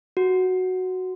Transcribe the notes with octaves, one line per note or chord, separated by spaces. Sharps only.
F#4